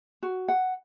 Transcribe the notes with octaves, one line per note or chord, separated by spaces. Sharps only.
F#4
F#5